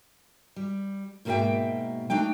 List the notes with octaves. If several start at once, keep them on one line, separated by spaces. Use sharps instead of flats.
G3
G#2 B2 A#3 E4 E5 G5
A3 D4 D#4 G5